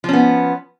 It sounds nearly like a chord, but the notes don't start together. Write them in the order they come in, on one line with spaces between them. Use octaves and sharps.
F3 C#4 B3